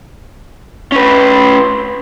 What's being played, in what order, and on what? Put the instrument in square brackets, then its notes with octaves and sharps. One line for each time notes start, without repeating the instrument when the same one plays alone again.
[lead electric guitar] C#4 B4